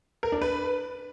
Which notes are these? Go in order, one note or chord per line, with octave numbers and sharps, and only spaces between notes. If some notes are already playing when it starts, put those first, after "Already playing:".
A#4
D4
B4